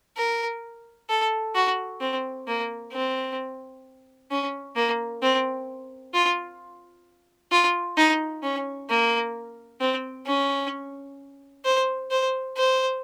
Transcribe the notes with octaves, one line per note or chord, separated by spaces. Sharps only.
A#4
A4
F#4
C4
A#3
C4
C#4
A#3
C4
F4
F4
D#4
C#4
A#3
C4
C#4
C5
C5
C5